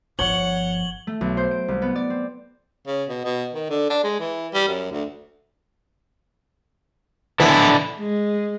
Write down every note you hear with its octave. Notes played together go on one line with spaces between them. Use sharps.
G1 F3 C#5 F#5 F#7 G7
A3
B1
C5
D7
C2
B3
D5
C4
C#3
B2
B2
D#3
D3
D4
G#3
E3
G3
F#2
D2
D3 E3 B3 E4
G#3